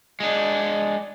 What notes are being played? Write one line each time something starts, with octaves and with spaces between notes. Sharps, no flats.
G#3 D4